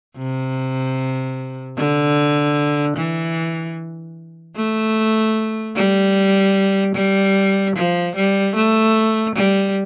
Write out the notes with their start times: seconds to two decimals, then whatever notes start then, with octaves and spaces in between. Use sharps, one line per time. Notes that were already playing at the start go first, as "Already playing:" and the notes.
0.17 C3
1.77 D3
2.97 E3
4.56 A3
5.76 G3
6.95 G3
7.76 F3
8.16 G3
8.56 A3
9.35 G3